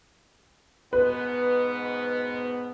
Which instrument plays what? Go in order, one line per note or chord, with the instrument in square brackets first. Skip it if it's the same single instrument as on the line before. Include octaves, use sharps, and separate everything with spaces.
[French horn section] G#2 B2 B3 [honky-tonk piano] B4